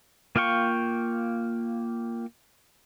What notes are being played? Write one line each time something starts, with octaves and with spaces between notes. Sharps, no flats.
A#3 F4 F5 G5 C#6